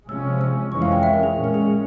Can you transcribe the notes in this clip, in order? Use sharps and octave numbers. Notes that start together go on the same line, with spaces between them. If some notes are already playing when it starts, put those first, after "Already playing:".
C3 F3 G#3 C#4 E6
E6
F2 E3 G#3 C#4 C#6
F5
G5
E5
A#4
G#4
A#2 G#3 C#4
A#4
G#4